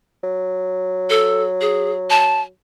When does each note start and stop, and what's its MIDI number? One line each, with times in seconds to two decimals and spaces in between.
0.24 2.49 54
1.10 1.43 69
1.61 1.91 68
2.10 2.41 81